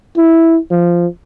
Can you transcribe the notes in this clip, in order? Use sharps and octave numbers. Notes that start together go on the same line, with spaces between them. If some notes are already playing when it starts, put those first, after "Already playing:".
E4
F3